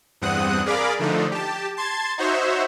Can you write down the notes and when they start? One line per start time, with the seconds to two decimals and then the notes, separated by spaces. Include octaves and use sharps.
0.22 E2 G2 C4 F#5 D#6 F#6
0.66 G#4 A#4 D5 F5 B5 D6
0.99 D3 F3 A3 D4 D#4
1.32 G4 A5
1.77 A5 C6 G#6 A6
2.18 D#4 F#4 C5 C#5 E5